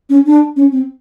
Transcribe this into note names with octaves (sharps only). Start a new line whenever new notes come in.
C#4
D4
C#4
C4